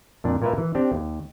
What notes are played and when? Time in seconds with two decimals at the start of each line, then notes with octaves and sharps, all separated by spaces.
0.24 F2 A#2 D4
0.42 A#2 A#3 A#4 B4 E5
0.58 E3
0.75 C4 D4 G4
0.92 D#2